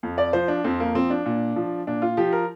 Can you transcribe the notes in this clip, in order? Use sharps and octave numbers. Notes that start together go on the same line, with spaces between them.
F2
D5
F3 C5
D4
F2 C4
A#3
F3 C4
D4
A#2
F3
A#2 D4
F4
F3 G4
A#4